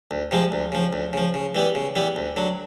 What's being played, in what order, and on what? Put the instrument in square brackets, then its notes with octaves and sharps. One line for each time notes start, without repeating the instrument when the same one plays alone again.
[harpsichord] D2
C3 F3 G#3
D2
C#3 F3
D2
C#3 F3
C#3
E3 G3 B3
C#3
E3 G3 B3
D2
D3 F#3